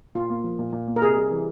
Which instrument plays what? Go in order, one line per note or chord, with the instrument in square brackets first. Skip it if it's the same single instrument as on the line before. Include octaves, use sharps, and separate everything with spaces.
[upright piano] A#2 [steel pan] F4
[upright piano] A#3
F3
A#2
A#2
A#3
[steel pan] A#4
[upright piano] C3 [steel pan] G#4
[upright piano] G3
E3